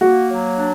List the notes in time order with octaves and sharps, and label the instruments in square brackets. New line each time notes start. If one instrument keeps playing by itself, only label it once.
[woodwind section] A#3 [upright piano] F#4
[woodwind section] F#3
D4